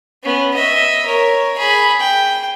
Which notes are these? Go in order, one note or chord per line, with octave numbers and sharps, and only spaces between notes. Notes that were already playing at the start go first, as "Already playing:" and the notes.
B3 C#4
D#5 E5
A#4 C#5
G#4 B5
G5